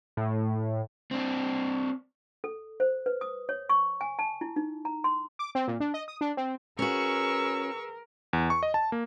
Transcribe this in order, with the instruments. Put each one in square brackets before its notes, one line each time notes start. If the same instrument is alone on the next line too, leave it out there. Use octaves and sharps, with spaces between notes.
[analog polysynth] A2
[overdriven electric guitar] C4 D4
[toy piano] A4
C5
B4
D#6
C#5
C#6
G#5
A5
E4
D#4
A#5
C6
[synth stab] D6
C4
A#2
D4
D#5
D#6
D4
C4
[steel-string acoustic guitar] C#4 F#4 [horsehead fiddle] G#4 B4 [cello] A#4 [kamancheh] C#6 E6
[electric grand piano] E2
C#6
D#5
A5
A#3